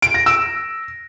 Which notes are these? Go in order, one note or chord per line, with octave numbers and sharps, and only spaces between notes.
D7
A#6
E6